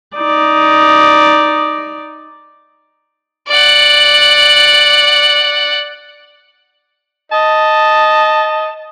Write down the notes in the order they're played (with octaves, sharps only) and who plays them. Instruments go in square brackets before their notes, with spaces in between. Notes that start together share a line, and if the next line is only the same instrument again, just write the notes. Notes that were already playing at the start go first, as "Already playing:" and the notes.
[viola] D#4 D5
[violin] D5 F#5
[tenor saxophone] D#5 [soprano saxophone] A5